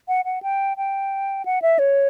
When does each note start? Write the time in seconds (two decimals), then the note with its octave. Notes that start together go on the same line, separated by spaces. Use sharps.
0.08 F#5
0.25 F#5
0.43 G5
0.77 G5
1.45 F#5
1.62 E5
1.79 C#5